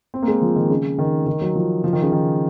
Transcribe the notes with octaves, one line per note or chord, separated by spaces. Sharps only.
C4
A#3
G#3
F3
D#3
C#3
D#3
D#3
F#3
F3
F3
D#3
C#3
D#3